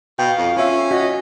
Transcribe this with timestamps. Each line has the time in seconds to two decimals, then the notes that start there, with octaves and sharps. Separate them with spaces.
0.19 B2 F5 G5
0.38 F2
0.57 C#4 F4 E5
0.91 F#4 D#5